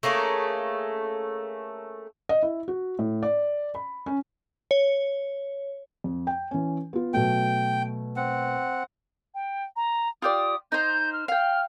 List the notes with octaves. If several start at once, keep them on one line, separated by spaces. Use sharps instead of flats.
A3 A#3 C#4 G#4
D#5
E4
F#4
A2
D5
B5
C#4
C#5
F2
G5
E3 C#4
B3 F4
B2 F#3 A3 G5
C4 F#5
G5
A#5
F4 G4 D5 D#6
D#4 C5 G6
F6
F5 G5 F6